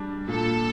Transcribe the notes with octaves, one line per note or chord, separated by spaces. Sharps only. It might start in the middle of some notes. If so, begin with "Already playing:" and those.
Already playing: G3 D4
A#2 A4